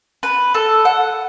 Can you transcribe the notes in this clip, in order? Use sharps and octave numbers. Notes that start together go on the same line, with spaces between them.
B4
A4
F#5